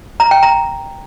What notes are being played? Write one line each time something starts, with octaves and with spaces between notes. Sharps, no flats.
A#5
G5
A#5